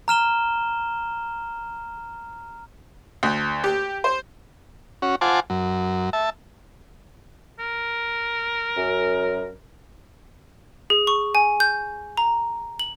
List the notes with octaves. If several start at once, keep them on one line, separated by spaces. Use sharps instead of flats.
A#5 F6 E7 G7
D2
G4
C5
C#4 F#4
F4 C5 F#5 G#5 A5 D6
F#2
E5 A5
A#4
F#2
G#4
C#6
G#5
G6
A#5
F#7